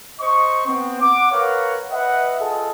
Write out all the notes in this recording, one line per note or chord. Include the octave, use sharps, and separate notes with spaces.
C5 D#5 C#6
B3 C4
F#5 D6
A#4 B4 C#5 F5 F#5
B4 D#5 E5 F#5
F4 G#4 A4 D#5